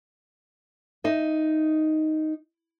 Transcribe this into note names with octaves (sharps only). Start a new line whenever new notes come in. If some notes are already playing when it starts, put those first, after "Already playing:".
D#4 D#5 E5